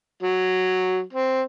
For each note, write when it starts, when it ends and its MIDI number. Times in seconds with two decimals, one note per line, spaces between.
0.23 1.02 54
1.13 1.41 60